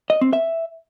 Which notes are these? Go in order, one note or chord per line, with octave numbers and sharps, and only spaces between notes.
D#5
C4
E5